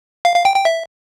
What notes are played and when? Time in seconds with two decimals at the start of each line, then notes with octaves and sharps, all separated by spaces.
0.25 F5
0.35 F5
0.45 G5
0.55 G5
0.65 E5